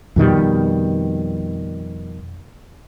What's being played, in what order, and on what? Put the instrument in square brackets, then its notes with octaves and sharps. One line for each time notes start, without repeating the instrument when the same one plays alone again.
[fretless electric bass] F2 B2 D#3 G3